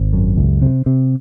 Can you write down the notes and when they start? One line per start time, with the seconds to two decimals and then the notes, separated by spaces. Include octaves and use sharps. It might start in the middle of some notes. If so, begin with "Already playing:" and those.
Already playing: G#1
0.13 F#2
0.37 C#2
0.62 C3
0.86 C3